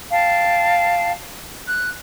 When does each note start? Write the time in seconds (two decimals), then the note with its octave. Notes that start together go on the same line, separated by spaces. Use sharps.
0.11 F5 G5 A5
1.68 F#6